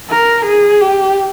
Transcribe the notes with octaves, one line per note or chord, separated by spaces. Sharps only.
A#4
G#4
G4